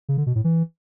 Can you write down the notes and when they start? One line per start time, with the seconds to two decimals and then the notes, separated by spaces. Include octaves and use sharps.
0.09 C#3
0.17 D3
0.26 B2
0.35 A2
0.44 E3